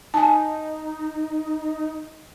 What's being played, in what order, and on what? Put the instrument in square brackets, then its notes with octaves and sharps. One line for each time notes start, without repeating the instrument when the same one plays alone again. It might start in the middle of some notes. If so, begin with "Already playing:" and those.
[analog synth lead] D#4 [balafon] G#5 A5